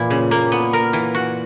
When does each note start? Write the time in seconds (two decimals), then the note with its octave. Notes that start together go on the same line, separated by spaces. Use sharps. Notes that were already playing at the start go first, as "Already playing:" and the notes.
Already playing: A#2 E3 E4
0.10 C#3
0.31 A#3
0.52 B3
0.73 A#4
0.93 E3
1.15 F#4